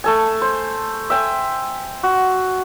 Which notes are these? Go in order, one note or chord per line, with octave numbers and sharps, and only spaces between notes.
A3 A4 G#5
C5
E5 G5 G#5
F#4